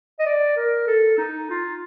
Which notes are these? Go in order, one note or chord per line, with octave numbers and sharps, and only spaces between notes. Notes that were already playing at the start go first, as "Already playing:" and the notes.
D#5
D5
A#4
A4
D#4
F4